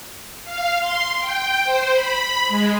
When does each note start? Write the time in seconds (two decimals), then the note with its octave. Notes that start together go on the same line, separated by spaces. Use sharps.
0.45 F5
0.80 C6
1.19 G5
1.64 C5
1.93 B5
2.48 G#3